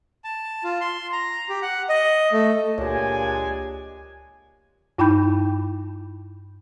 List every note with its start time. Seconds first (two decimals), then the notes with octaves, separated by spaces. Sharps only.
0.24 A5
0.64 F4
0.81 C6
1.13 A#5
1.49 G4
1.62 F#5
1.89 D#5
2.32 A3
2.78 C#2 A#2 G#3 D4 G4 C#5 G#5
4.98 G2 D#4 E4 G5 B5 G6